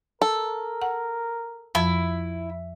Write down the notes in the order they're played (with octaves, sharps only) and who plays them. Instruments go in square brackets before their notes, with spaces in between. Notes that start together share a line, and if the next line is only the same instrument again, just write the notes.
[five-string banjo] A4 [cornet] A#4
[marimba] F#5
[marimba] F2 F3 E6 [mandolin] E4